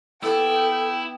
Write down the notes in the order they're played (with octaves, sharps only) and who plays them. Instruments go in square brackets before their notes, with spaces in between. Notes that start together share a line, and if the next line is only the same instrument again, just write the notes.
[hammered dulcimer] B3 G4 [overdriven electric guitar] E4 [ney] A4 [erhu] G5